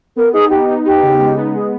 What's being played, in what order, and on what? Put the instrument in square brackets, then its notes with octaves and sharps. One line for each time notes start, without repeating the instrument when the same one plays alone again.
[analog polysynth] B3 [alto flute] A#4
[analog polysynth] D#4 [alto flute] G#4
[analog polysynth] B3 [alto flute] G4
[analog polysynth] D#4
[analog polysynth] D#4 [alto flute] G4
[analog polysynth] C#3
G#3
B3
[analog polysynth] G#3 [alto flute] G#4